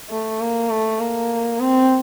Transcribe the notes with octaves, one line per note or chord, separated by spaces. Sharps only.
A3
A#3
A3
A#3
C4